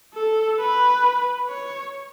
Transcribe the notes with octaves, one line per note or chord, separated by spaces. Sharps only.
A4
B4
C#5